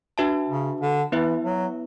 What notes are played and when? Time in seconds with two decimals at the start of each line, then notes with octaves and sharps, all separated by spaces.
0.18 D4 F#4 B4 E5 A5
0.49 C#3
0.81 D3
1.12 E3 B3 E4 B4 E5
1.44 F#3